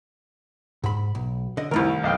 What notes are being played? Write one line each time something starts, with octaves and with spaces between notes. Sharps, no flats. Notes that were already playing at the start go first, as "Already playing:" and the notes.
G#2 B5
B1
D3 D#5
C2 D#3 A3 E4 A#4
B1 F5 G5